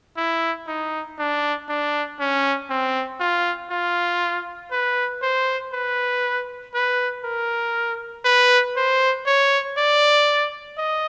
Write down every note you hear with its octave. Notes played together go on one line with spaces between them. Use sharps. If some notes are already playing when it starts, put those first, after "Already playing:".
E4
D#4
D4
D4
C#4
C4
F4
F4
B4
C5
B4
B4
A#4
B4
C5
C#5
D5
D#5